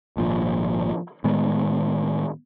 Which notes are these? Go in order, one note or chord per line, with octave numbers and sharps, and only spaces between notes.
G#1 A#2 F3
A2 D#3 G#3 B3